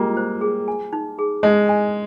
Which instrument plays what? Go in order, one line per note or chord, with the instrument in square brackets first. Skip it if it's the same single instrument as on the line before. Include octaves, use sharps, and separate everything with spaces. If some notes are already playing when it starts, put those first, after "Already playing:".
Already playing: [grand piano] G3 G#3 A#3 [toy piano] F4
[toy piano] C5
G#4
G#5
D#4
G#4
[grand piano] G#3 [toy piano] D#4
[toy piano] G#5